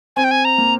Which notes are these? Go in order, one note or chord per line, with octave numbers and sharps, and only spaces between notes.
C4 G#5
G5
G#5
A#5
A#3